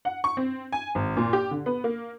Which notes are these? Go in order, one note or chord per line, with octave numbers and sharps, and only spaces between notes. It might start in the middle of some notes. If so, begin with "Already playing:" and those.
F#5
C#6
C4
G#5
G#1
A#2
G4
D3
B3
A#3